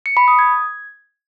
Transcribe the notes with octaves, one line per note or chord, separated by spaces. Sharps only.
C#7
B5
D#6
G#6